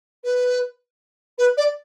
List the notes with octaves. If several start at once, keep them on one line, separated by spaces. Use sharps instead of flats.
B4
B4
D5